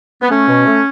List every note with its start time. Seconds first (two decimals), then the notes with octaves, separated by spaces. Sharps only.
0.22 B3
0.30 A3 C#4
0.48 B2
0.66 A3